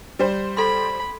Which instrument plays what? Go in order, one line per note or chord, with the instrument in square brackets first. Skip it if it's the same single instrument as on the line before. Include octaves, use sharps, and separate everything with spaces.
[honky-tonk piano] G3 C5
[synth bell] A4 C6 [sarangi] B5